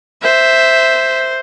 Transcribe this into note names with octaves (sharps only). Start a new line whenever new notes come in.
C5 E5